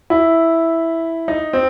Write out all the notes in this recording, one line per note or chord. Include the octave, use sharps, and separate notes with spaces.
E4
D#4
C4